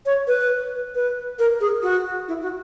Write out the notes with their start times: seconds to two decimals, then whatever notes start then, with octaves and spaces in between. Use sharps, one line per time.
0.06 C#5
0.27 B4
0.95 B4
1.39 A#4
1.60 G#4
1.82 F#4
2.28 E4
2.42 F#4